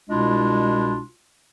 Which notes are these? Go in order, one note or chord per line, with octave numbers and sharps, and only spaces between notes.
C2 B2 G#3 D4 E4 F4